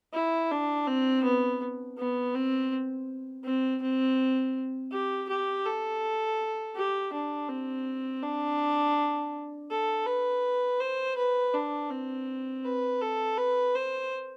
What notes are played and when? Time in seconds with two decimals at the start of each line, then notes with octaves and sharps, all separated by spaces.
0.13 E4
0.51 D4
0.87 C4
1.24 B3
1.98 B3
2.35 C4
3.44 C4
3.82 C4
4.92 G4
5.29 G4
5.65 A4
6.76 G4
7.13 D4
7.49 C4
8.23 D4
9.70 A4
10.07 B4
10.80 C5
11.17 B4
11.54 D4
11.90 C4
12.64 B4
13.01 A4
13.37 B4
13.75 C5